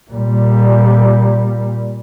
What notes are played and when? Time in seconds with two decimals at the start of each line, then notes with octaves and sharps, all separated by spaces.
0.11 A#2 G3